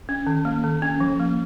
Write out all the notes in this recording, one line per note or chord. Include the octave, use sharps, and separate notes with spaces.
C#4
D#3
A#3
D#3
C#4
F3
A#3